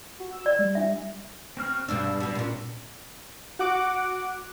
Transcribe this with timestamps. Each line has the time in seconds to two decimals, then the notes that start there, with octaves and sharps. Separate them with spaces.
0.20 F#4
0.32 E6
0.46 D5
0.59 G3
0.75 D4 E5
1.57 C4 F#4 F6
1.88 G2 B2 D4 E6
2.20 B2 G3
2.35 A#2 C#4 D4
3.59 F#4 F#5 D6